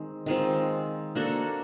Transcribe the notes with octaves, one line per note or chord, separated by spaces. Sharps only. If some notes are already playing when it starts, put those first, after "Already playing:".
Already playing: D#3 G#3 C4
D#3 G#3 C4 F4
A#3 D4 F#4 A4